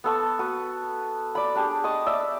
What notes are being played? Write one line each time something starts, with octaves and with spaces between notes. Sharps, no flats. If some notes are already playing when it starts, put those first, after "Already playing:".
B3 A4 C#6
F#4 B4
D5 B5
D4 G4 G#4
D#5 A5 C#6
D5 E5